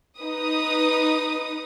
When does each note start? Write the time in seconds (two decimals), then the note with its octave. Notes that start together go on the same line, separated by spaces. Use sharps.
0.19 D#4 B4 D#6